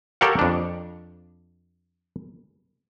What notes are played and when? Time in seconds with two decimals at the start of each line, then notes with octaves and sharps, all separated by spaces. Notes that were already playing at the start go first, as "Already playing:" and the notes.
0.21 G4 A4 A#4 C#5 F5 F#5
0.39 F2 D4